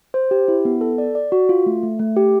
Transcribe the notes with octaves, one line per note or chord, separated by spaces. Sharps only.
C5
G4
E4
B3
A4
D5
D5
F#4
F4
A3
A3
A3
G4